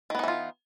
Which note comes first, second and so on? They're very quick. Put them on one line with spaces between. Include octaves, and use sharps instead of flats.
D#3 B3 D#4 E3 F4